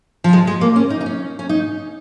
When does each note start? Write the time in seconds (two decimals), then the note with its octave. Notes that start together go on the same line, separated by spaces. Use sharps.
0.24 F3
0.33 G#3
0.47 G#3
0.61 A#3
0.76 C#4
0.90 D#4
1.01 D#4
1.06 C#4
1.39 C#4
1.49 D#4